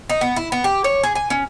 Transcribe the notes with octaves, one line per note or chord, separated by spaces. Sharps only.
D#4
B3
E4
B3
G4
C#5
G#4
G#5
C#4